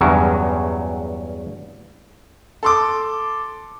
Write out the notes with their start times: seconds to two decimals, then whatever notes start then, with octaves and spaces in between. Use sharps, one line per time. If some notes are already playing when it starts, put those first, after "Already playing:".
0.01 E2 G2 C#3 F#3
2.63 A4 C6 D6